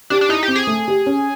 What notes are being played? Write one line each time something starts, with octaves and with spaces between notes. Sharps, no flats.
D4 G4
D4
D#4 E4
G4
C4
G#4
A3
G4
C#4